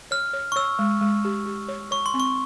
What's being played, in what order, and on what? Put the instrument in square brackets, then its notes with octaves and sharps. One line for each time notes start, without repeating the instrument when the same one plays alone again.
[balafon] C#5 [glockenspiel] F6
[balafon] C#5
[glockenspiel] C#6
[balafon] C#5 [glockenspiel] E6
[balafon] G#3
G#3
G4
G4
C#5
[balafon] C#5 [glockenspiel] C#6
[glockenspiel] C6
[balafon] C4
[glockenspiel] C#6